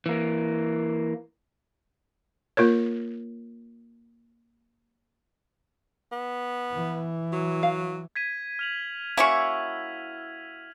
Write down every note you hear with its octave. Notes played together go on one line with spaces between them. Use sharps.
E3 A#3
A#3 F4 A#4 C#5
B3
E3
F#3
F5
G#6 B6 D#7
F6 F7 F#7
A#3 C#4 E4 F#4 C#6